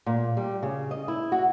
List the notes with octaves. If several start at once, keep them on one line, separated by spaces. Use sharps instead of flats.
A#2
G3
C#3
D#5
E4
F#4